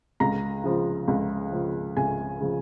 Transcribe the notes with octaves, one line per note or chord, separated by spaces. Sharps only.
C#2 A#5
C#3 F3
C#2
C#3 F3
C#2 G#5
C#3 F3